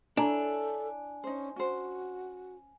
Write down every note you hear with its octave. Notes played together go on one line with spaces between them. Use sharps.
D4 E4 A4 C#5 G#5 A#5
C#4 D#4 C5
C#4 F#4 C5